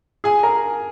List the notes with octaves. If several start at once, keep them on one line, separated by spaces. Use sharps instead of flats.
G#4 G#5
A#4 A#5